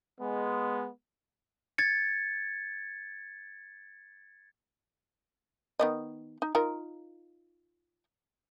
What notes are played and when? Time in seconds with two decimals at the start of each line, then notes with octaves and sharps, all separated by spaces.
0.20 G#3 B3
1.78 G#6 A6 C#7
5.79 D#3 B3 D#5
6.42 D#4
6.55 D#4 F4 A#4